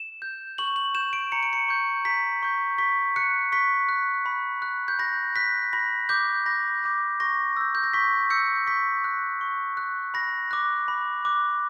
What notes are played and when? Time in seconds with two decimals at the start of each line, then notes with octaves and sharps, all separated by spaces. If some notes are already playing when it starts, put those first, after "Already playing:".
Already playing: E7
0.22 G6
0.58 C#6 F#7
0.76 F#7
0.95 G6 E7
1.13 D7
1.32 A#5 C#7
1.43 D7
1.53 C#7
1.69 C#6 G6
2.05 A#5 B6
2.43 C#6 G6
2.78 C#6 B6
3.16 F#6 C#7
3.52 C#6 B6
3.89 F#6
4.26 B5
4.62 F#6
4.88 G6
4.99 B5 A#6
5.36 F#6 B6
5.73 B5 A#6
6.09 D6 G6
6.46 B5 A#6
6.84 D6 G6
7.20 C#6 A#6
7.57 E6 G6
7.75 G6
7.83 A#6
7.93 C#6 B6
8.30 E6 G6 C#7
8.67 C#6 B6
9.04 F#6
9.41 C#6
9.77 F#6
10.14 B5 A#6
10.51 D6 F#6
10.88 B5
11.25 D6 F#6